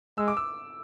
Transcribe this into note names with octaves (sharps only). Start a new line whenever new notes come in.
G#3 E6
D6
E6